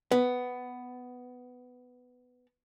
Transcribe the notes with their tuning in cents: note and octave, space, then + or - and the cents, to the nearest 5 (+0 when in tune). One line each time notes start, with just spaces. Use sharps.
B3 +10